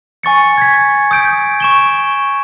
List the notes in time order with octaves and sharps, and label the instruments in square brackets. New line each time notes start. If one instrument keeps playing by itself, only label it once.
[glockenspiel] G#5 C#6 A6 C#7
G#6 B6
D#6 G6 D7
C#6 E7 G7